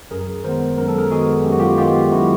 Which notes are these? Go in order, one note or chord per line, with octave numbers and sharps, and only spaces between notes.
F#2 G#4 A#4
D#3 G#3 B3 A#4 C5
F#2 A#4
A4
G#4 A#4
D#3 G#3 B3 F#4 G#4
F#2 G4
F#4
F4 G4
D#3 G#3 B3 F4 G4
F#2 E4 F#4